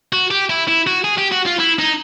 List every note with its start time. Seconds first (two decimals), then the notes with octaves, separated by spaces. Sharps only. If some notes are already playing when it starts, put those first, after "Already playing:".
0.13 F#4
0.31 G4
0.50 E4
0.68 E4
0.87 F#4
1.04 G#4
1.18 G4
1.32 F#4
1.46 F4
1.60 E4
1.79 D#4